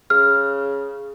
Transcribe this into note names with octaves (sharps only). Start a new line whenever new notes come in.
C#3 F6